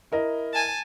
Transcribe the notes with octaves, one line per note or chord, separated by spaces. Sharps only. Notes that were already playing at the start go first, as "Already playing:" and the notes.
E4 A#4 D#5
G#5 A5